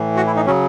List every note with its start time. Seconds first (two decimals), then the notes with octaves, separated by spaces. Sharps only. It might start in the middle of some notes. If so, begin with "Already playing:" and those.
Already playing: A2 E3
0.17 F#4
0.27 E4
0.36 D#4
0.46 C#3 F#3 C#4